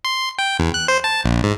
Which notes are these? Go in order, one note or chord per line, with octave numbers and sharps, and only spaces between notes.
C6
G5
E2
F#6
C5
A5
A#1
G#2